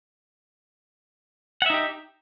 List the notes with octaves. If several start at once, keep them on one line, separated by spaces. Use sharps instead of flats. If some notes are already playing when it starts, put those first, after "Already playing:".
D#4 G4 E5 F#5